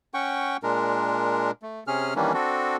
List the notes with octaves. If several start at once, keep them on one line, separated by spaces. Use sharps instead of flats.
C#4 F#5 G5 C#6
A#2 G#3 D4 A#4
A3
C3 C#4 G#4 F6
D#3 E3 G3 A#3 C#4 D4
C4 D4 F#4 A4